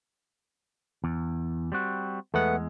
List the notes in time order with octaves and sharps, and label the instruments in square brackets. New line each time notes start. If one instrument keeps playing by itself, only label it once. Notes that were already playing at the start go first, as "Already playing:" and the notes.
[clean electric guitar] E2
G3 C4 F#4
[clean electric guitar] E2 G#3 [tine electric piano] A3 B3 F#5